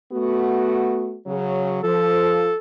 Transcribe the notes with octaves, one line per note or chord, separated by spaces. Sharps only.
A3 B3 F#4
C#3 F#3
F3 A4